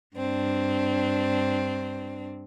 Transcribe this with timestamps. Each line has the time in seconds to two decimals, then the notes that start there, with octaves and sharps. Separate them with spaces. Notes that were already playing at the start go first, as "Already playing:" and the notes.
0.17 G2 C4 D4